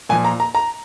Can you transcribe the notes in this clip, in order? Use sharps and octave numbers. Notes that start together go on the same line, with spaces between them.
A#2 F3 G#5
A#5
A#5
A#5